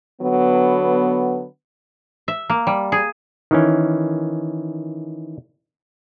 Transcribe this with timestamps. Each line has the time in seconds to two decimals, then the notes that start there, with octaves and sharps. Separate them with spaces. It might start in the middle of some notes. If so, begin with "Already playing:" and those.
0.22 D3 F#3 B3
2.28 E5
2.50 A#3
2.67 G3
2.92 G#4
3.51 D#3 E3 C#4